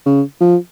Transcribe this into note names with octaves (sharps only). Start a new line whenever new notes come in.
C#3
F3